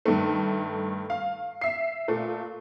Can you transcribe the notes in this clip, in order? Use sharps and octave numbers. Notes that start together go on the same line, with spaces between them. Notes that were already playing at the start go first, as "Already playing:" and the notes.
G2 D#3 A3
F5
E5 C7
A#2 A3